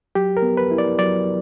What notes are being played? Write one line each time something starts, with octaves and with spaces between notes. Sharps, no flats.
F#3 G4
A#4
B3
B4
E4
D5
F#3 D5